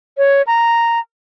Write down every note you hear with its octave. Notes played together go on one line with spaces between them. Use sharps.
C#5
A#5